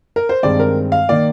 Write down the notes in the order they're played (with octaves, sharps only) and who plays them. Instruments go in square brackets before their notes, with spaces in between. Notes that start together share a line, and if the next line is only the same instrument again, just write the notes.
[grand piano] A#4
C5
G2 D#3 G#3 C4 D5
A#4
F5
D#3 A#3 D5